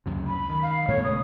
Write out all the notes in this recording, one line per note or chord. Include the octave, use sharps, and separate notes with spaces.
C#2 F#2 C3
B5
D#3
F5
A2 A3 B3 C#5
A#2 C#3 G#3 D#6